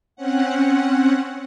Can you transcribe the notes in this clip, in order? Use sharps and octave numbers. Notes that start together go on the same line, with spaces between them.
C4 C#4 F#5